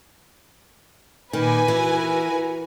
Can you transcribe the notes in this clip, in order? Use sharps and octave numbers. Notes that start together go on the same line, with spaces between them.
A#2 D#3 B4 G#5 D6 A#6
E3 F#4 A#4